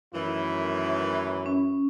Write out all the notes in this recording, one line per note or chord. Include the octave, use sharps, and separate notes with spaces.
F#2 A2 D#3 E3 E4
C#4